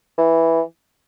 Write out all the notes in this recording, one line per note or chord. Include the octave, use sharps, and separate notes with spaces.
E3